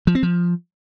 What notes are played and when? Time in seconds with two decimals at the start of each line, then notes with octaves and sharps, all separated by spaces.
0.07 F3
0.15 C4
0.23 F3